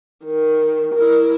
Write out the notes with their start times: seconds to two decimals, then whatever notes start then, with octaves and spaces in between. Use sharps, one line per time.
0.25 D#3
0.95 E4 A#4